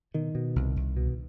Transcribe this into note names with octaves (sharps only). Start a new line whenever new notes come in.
B2 D#3
B2
C2
C2
B2